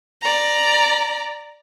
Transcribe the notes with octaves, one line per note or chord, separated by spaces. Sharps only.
D5 A#5